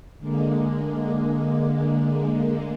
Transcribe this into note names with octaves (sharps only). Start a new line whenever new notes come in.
D3 G#3 A#3